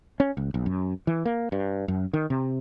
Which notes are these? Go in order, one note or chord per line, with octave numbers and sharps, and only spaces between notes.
C#4
C#2
B1
F#2
E3
A#3
G2
F#2
D#3
C3